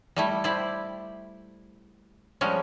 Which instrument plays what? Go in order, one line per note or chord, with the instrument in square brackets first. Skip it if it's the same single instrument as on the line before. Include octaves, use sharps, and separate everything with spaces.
[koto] G3 A3 E4
E4 G4 C5 D5
F3 G3 G#3 C#4